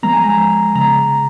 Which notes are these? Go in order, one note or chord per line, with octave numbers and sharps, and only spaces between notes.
F3 G#3 B3 A#5
G#5
A#5
C#3 A#5